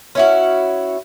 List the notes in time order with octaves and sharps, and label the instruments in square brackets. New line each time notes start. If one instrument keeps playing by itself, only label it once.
[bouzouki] C#4 E4 F#4